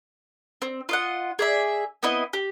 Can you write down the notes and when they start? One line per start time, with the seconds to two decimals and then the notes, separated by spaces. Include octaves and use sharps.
0.62 C4
0.89 F4 D#5 F#5
1.39 G#4 D5 E5
2.03 B3 C4 E4 D#5
2.33 G4